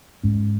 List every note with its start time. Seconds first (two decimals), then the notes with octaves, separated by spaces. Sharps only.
0.23 G#2 G#3 C#4